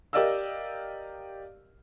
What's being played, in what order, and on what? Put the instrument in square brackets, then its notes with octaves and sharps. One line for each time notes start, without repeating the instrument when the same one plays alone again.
[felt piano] G4 A#4 D5 D#5 F5 E6